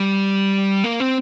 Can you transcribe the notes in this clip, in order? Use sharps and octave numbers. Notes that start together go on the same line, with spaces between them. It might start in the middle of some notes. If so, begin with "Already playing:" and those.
Already playing: G3
A#3
C4